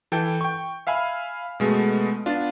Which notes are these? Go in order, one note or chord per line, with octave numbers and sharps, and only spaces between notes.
E3 A4 G5 G6
G5 C#6
E5 F5 G#5 B5 F6
B2 G#3 A3 B3
B3 D4 F4